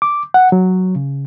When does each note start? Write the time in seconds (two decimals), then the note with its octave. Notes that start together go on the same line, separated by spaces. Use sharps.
0.02 D6
0.34 F#5
0.52 F#3
0.96 C#3